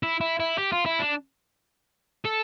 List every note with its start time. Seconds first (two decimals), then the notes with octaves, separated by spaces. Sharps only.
0.03 E4
0.21 E4
0.40 E4
0.58 G4
0.72 F4
0.86 E4
0.99 D4
2.25 A4